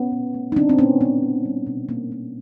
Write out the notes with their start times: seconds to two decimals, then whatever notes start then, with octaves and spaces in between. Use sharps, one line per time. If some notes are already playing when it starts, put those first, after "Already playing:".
Already playing: B3 C#4
0.12 A#2
0.34 A3
0.52 D#4
0.56 G3 C4 D4
0.69 C4
0.79 A#2 B3 C#4
1.01 A#2 B3
1.22 A#3
1.45 G3
1.67 B2
1.89 B2 A#3
2.12 A#3